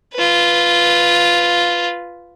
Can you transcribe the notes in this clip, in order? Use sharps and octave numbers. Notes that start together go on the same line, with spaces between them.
F4 B4